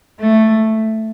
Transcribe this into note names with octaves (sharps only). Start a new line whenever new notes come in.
A3